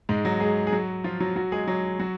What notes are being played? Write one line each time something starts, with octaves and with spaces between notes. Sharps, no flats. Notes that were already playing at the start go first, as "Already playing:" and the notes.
G#2 G#3
F#3 F#4
G#3 G#4
G#4
F#3 F#4
F3 F4
F#3 F#4
F#3 F#4
G#3 G#4
F#3 F#4
F#3 F#4